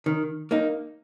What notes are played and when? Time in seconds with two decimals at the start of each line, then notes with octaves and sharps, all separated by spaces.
0.06 D#3
0.51 A#3 D#4